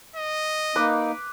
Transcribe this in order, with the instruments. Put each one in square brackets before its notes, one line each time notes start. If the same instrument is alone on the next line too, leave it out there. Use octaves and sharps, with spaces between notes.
[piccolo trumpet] D#5
[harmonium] A#3 D#4 [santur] B4 D6